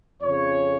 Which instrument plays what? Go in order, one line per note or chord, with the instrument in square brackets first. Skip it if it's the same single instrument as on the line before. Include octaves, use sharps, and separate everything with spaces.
[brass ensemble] F2 C#3 C#5